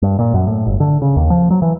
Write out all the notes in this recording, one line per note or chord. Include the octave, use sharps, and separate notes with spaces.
G2
A#2
F#2
A2
G1
D3
C#3
D#2
F3
F#3
E3